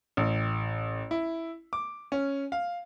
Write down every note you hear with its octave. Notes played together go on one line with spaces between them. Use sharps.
A1
E4
D6
C#4
F5